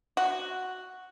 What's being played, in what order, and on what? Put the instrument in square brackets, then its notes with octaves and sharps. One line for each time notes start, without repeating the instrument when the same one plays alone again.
[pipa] F#4